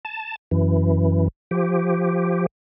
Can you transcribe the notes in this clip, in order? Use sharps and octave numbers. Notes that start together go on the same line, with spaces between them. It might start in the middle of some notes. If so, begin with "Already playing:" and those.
A5
F#2 E3
F3 G4